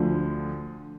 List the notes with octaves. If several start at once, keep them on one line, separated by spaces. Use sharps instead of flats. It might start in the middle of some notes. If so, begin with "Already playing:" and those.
Already playing: D2 D3 F3